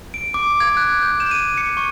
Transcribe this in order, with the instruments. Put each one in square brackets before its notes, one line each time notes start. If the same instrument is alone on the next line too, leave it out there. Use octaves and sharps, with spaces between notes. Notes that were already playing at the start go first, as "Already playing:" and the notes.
[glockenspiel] D7
D6
G#6
F#6
G6
E7
D#7
C#7
C#6